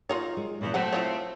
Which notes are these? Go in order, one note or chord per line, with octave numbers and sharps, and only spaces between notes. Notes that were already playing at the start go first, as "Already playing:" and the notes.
D#4 F4 F#4 A#4 C#5
G#3
E2 A#2 C#3 F#3
F#3 A3 C4 A4 B4 C#5 F#5
E4 F4 C#5